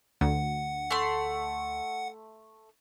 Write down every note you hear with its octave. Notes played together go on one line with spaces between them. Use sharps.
D2 F#5
A3 C6